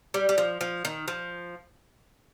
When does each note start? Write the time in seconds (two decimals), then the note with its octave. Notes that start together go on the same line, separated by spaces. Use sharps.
0.14 G3
0.29 G3
0.38 F3
0.61 F3
0.85 D#3
1.08 F3